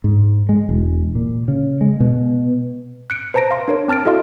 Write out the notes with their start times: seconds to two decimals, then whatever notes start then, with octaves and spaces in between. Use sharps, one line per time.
0.04 G#2
0.49 G#3
0.69 E1
1.15 A#2
1.48 C#3
1.81 G#3
2.00 B2
3.10 F#6 C#7 D7
3.34 B4 C5 A5 A#5 A#6 D7
3.51 F5 C6
3.68 D4 A#4 C#5
3.88 C4 A5 F6 A6 D7
4.05 E4 F#4 A4 D#5 F5 C6